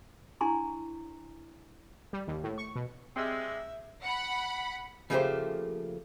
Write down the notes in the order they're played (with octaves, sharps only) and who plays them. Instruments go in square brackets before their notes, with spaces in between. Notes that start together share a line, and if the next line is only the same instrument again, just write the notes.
[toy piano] D4 E4 G#5 A#5 C6 C#6
[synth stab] G3
D#2
A2
C#6
B2
[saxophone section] C3 G3 G#3 [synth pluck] C4 E6 [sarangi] E5
[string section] F#5 B5
[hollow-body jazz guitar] C#3 F3 A3 A#3 G4 C5